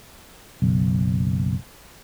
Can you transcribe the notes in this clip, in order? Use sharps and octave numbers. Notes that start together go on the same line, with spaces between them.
F#1 B1